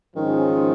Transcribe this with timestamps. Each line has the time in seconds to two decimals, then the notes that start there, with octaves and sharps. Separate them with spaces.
0.15 G#2 D#3 F3 G#3 C#4